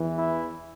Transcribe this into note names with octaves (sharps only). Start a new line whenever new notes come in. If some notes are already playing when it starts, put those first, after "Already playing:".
Already playing: E2 E3
E4